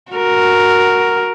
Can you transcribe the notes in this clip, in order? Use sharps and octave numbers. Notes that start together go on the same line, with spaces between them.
F#4 A#4